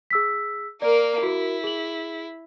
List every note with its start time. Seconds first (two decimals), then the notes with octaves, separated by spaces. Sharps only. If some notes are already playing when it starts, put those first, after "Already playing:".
0.10 G#4 E6 B6
0.82 A#3 A#4 D5
1.23 E4 F#4 A#4
1.64 G#4 F#7